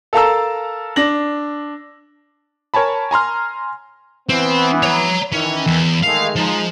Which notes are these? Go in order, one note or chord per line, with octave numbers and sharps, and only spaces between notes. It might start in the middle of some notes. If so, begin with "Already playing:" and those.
A4 A#4 F5 A5 A#5 E6
D4 A#6 F#7
A#4 C#5 G#5 A5 B5
G#5 A#5 C6 F6
E3 B3 C4
C#5 A#5
D#3 E3 C#4
E2
D#3 G#3 A3 F5
F3 G#3 D#4